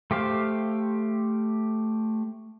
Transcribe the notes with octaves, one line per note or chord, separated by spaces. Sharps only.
A3 G4 C5 F5